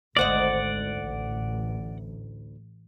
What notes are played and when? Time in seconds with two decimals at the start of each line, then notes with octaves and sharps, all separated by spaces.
0.17 G#1 D2 C5 D5 D#5 F#5
0.95 A1